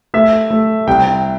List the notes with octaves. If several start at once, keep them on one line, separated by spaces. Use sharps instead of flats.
A3 E5
A3
C2 G5